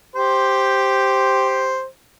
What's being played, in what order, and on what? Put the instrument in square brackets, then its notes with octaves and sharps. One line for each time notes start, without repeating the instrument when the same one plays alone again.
[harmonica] G4 C5